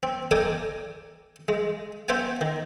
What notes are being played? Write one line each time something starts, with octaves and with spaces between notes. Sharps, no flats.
C4
A4 A#4 D5 D#5 G5 G#5
G#3
B3 C5 E5 G5 G#5
D#3